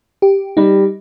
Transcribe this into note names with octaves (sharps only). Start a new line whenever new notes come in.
G4
G3 D#4